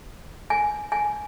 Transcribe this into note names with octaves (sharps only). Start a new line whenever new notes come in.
G#5
G#5